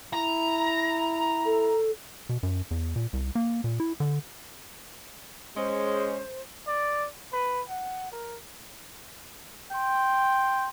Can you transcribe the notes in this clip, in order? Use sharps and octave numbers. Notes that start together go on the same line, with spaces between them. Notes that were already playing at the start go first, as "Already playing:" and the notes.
E4 A#5
A4
B2
F#2
E2
A#2
C2
A#3
A#2
E4
D3
G#3 C#4 C5
D5
B4
F#5
A#4
G5 C6